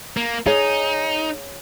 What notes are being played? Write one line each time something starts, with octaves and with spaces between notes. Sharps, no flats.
A#3
D#4 G#4 C#5 F5